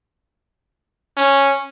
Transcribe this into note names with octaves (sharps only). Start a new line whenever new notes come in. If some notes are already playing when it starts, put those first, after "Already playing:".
C#4